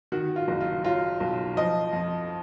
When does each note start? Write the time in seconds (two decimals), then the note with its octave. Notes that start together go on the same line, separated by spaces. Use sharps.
0.12 D#3 F#4
0.36 F4
0.48 F#1
0.61 F4
0.85 F#3 F4
1.20 B1
1.57 F3 D#5
1.93 F2